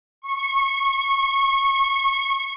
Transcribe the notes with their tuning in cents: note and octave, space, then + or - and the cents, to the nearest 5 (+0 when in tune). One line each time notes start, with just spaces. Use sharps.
C#6 -20